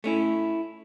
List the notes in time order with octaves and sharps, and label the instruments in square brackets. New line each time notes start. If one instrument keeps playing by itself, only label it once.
[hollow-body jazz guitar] A3 C#4 E4